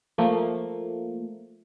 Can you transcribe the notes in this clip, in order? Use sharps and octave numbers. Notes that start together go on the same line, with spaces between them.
F3 A3 A#3